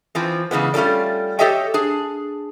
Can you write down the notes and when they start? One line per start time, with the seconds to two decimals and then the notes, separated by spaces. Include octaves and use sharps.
0.15 E3 F3 C4
0.51 C#3 E3 G#3 B3
0.74 G3 A3 C#4 F4 A4 D5
1.39 G4 A4 C#5 D#5 E5 G5
1.74 D4 G#4